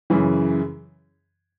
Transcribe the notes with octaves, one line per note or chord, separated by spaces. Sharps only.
F#2 C#3 E3